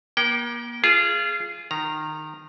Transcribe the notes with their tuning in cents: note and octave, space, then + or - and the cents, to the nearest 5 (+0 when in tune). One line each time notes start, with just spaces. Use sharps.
A#3 +35 G5 -20
F4 -25 G#4 +0
D#3 -15 A#5 +0